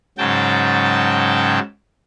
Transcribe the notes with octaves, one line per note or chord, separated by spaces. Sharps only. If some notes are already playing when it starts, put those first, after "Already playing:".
G#2 C#3 F#3 G5 A5